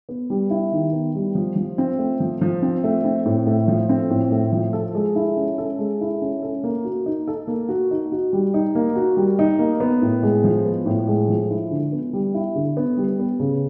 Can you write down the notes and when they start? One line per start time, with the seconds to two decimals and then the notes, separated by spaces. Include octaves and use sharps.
0.09 B3
0.30 G3
0.50 E4
0.72 D#3
0.93 B3
1.15 G3
1.35 F3
1.56 F3
1.78 C4
1.98 A3
2.20 F3
2.41 F3
2.62 C4
2.84 A3
3.05 C4
3.25 A2
3.47 A3
3.68 F3
3.89 C4
4.10 A2
4.32 A3
4.52 F3
4.73 A4
4.95 G#3
5.16 E4
5.37 C#4
5.58 A4
5.79 G#3
6.01 E4
6.22 C#4
6.42 A4
6.64 A#3
6.85 F#4
7.06 D#4
7.27 A4
7.48 A#3
7.69 F#4
7.91 D#4
8.12 F#4
8.33 G3
8.54 D#4
8.75 A#3
8.96 F#4
9.17 G3
9.39 D#4
9.59 A#3
9.80 B3
10.02 A2
10.23 G#3
10.44 F3
10.65 B3
10.86 A2
11.07 G#3
11.29 F3
11.50 E4
11.71 D3
11.92 B3
12.13 G3
12.34 E4
12.55 D3
12.77 B3
12.97 G3
13.19 B3
13.40 C#3